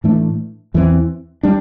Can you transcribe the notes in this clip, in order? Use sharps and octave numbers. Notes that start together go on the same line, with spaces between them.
A2 E3 A3 D4
E2 E3 G3 C4
G3 D4